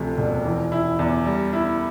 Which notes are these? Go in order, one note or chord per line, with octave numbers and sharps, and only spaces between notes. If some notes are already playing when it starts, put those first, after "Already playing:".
Already playing: D2 C3 F3
E1
E3
E4
E2
G3
E4